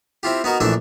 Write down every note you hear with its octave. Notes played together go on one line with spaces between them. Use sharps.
C4 E4 F4 G4
B3 D#4 F#4 A#4
A#1 E3 A3 D4 E4 E5